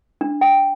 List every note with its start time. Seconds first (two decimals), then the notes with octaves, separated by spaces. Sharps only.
0.21 D4
0.41 G5